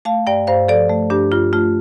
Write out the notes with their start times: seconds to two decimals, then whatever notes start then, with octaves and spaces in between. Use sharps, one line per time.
0.05 A3 F5 A5
0.27 G2 D5 G5
0.47 G2 C5 F5
0.68 F3 A4 D5
0.90 A3
1.10 G2 D4 G4
1.32 G2 F4
1.53 A3 F4